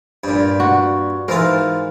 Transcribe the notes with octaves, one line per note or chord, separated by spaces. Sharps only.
G2 A#2
F#4
G#2 E3 F4 A#4